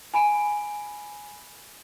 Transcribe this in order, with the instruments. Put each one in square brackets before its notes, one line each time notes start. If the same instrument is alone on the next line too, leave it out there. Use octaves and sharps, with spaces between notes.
[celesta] G#5 B5 D7